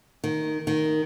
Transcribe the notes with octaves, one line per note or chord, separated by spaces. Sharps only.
D#3
D#3